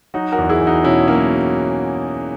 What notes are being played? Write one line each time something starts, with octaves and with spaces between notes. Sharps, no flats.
F#3 D#4 F#4
F#4 A#4
E2
E4 G#4
E2
D#4 F#4
B2 C#4 E4
F#3 A#3 C#4